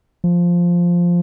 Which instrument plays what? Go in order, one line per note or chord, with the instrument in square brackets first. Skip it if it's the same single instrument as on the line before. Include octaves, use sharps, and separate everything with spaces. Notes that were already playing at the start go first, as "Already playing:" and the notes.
[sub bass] F3